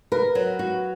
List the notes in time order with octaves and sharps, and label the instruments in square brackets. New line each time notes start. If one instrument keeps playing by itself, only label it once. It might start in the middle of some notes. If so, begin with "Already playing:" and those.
[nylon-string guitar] A#4 [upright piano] B4
[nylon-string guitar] F#3
F#4